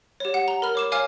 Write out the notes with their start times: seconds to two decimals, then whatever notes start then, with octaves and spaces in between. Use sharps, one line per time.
0.20 G4 C#5
0.34 F#5
0.48 A#5
0.62 A#4 B5 F6
0.75 C#5 D6 E7
0.92 C#5 F5 G#5 D6 F6